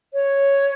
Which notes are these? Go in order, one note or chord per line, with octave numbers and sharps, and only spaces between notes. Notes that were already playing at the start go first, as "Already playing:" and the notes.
C#5